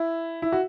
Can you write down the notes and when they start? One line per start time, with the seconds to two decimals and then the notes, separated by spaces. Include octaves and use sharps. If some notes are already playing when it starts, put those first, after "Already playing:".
Already playing: E4
0.42 E4
0.52 F#4